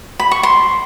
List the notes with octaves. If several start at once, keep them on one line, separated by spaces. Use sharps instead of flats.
B5
C#6
C6